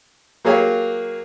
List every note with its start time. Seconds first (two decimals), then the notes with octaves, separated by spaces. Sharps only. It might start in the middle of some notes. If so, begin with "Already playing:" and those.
0.45 F#3 A#3 G4 G#4 C#5 F5